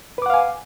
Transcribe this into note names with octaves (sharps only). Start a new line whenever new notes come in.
B4 F5 F#5 G#5 D6